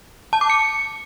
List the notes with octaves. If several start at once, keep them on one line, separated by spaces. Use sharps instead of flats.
A5
D6
C#7